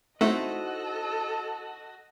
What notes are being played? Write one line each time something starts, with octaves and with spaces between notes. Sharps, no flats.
A3 C4 D#4 E4 F#4 A4 D#5